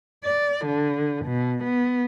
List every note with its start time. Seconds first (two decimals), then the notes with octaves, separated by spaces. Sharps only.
0.24 D5
0.65 D3
1.25 B2
1.64 B3